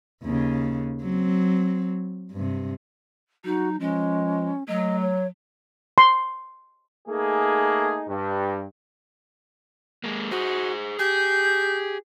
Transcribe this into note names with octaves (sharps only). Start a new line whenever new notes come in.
D#2 C#3
F#3 C4
G2 C3
F#3 D#4 F#4
F3 G#3 C#4
F#3 A3 D#5
C#5
C6
A3 A#3 D#4 G#4
G2
G#3 A#3
F#4 G#4 C5
G4 G#4 G6